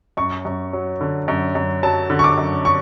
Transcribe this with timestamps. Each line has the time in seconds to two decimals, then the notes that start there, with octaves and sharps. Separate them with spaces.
0.17 F#2 C#6
0.45 F#2
0.73 F#3
1.01 D3
1.28 F#2
1.55 F#2
1.83 F#3 A5
2.10 D3
2.19 C#6
2.24 D6
2.38 F#2
2.65 C#6